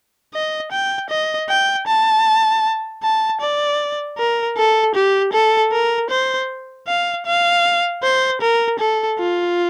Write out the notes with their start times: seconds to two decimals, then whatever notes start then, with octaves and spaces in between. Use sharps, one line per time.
0.34 D#5
0.72 G5
1.10 D#5
1.49 G5
1.87 A5
3.03 A5
3.41 D5
4.18 A#4
4.57 A4
4.95 G4
5.33 A4
5.72 A#4
6.10 C5
6.88 F5
7.26 F5
8.03 C5
8.41 A#4
8.79 A4
9.19 F4